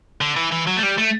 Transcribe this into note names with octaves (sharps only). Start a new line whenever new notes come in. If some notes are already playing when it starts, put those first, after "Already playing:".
D3
E3
E3
F#3
A3
G3
A3